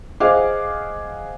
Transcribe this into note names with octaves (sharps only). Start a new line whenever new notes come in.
G#4 C5 D#5 F5 F#5 D6